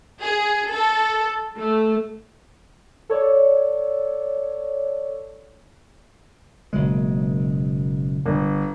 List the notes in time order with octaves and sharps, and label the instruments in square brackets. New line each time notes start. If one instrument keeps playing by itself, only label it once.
[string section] G#4
A4
A3
[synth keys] A4 C#5 D5
[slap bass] F#1 B2 G#3
[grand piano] G1